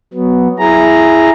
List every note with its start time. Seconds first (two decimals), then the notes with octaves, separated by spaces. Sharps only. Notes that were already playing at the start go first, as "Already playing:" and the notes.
0.14 F#3 B3
0.59 E4 G#4 A#5